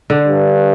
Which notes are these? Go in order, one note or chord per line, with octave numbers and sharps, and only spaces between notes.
D3
G2